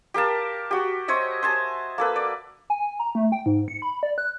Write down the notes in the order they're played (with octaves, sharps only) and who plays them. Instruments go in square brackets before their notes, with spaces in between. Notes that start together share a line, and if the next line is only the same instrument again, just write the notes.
[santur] G4 A#4 F5 A5
F#4 G4
C5 C#5 D#5 E5
C5 G#5 A5
A#3 A4 B4
D5
[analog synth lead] G#5
A#5
A3
G5
G#2
C#7
B5
D5
F#6